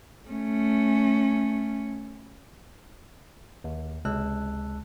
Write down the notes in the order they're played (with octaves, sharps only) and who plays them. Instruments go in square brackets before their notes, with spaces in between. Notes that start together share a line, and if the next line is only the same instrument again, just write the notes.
[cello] A3 C#4
[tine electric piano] D#2
C#2 C3 G#3 A5 E6 F#6